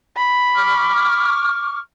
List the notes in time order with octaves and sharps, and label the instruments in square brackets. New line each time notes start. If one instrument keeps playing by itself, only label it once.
[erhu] B5
[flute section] C#6 D6 F6